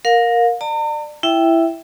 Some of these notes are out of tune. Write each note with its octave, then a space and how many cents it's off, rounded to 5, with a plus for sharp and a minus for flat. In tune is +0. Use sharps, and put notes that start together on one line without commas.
A#4 +0 F5 +30
D5 +30 A#5 -45
E4 +10 E5 +0 G5 +0